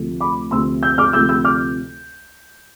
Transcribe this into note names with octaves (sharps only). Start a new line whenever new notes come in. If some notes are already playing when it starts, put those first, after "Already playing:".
Already playing: D2 C3 F3 A3
B5 D6
D2 C3 F3 A3 C6 E6
E6 G6
D6 F6
D2 C3 F3 A3 E6 G6
E6 G6
D6 F6